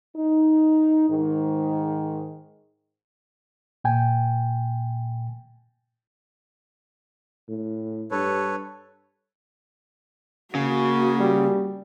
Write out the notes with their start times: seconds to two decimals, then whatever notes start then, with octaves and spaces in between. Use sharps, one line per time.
0.16 D#4
1.09 G#2 D#3
3.84 A#2 G5 G#5
7.49 A2
8.11 G2 A4 B4 C#5
10.55 C#3 A#3 F#4
11.20 G3